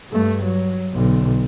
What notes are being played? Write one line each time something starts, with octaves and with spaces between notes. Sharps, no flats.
G2 A3
F#3
B1 D3